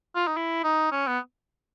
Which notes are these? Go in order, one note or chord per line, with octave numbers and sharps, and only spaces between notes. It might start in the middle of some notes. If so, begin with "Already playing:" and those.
F4
D#4
E4
D#4
C#4
B3